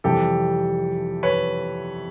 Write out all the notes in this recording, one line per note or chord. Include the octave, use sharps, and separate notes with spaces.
F2 C3 E3 G3 G4 A4
B4 C#5